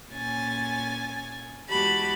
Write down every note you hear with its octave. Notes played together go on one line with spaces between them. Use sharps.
A#2 C#4 G#5 A6
E2 G#3 F#4 G4 A5 B5